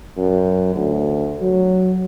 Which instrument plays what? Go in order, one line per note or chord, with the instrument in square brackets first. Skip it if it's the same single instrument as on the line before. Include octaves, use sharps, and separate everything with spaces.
[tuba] F#2
D2
F#3